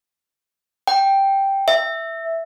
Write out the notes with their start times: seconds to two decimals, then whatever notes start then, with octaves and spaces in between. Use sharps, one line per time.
0.87 G5
1.68 E5